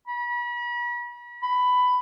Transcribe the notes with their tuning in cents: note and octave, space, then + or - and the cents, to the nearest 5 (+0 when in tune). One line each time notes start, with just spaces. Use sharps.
B5 -40
B5 +15